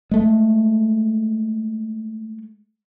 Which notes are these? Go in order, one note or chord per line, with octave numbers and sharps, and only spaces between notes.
G#3 A3